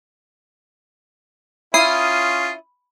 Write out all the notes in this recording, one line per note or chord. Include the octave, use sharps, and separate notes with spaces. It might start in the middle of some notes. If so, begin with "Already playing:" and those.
C#4 E4 F4 D#6 C7